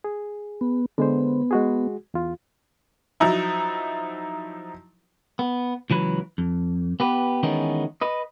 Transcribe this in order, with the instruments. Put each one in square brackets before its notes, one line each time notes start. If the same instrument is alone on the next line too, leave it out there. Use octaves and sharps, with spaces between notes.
[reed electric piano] G#4
[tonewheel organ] B3
[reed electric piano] D3 G#3 C5 [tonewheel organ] B3
[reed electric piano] G#3 F#4 G#4
E2 F4
[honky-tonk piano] F3 F#3 D#4 E4
[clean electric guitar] B3
C#2 E3 F#3 B4
F2
B3 G4 B4
D#3 E3 G#3 B3 C#4 D#4
B4 D#5